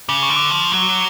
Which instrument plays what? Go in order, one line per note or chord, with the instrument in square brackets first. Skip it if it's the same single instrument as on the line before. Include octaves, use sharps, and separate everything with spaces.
[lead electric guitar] C#3 [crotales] D6
[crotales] C#6
[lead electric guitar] D3
[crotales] D6
[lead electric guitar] F3 [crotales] C#6
[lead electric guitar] F#3